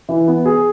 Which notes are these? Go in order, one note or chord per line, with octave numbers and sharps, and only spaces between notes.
E3
B3
G#4